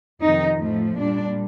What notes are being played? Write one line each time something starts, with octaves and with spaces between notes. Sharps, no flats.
F2 C3 D#3 D#4
A2 F3 A3
A#2 G3 D4